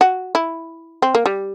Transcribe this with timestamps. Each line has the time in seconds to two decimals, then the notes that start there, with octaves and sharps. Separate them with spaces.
0.01 F#4
0.35 E4
1.02 C4
1.15 A#3
1.26 G3